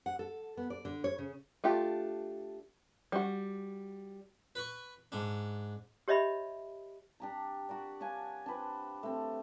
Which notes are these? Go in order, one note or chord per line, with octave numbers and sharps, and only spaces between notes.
F#5
A4
B3
D5
D3
C#5
C#3
A3 D4 F4 G4
G3 F#4
B4 C#6
G#2 D4
G4 C#5 D#5 E5 B5
D4 G4 A#5
F#4 A#4 D5
D4 C#5 F5 G#5
D4 G4 B4 C5
A3 C4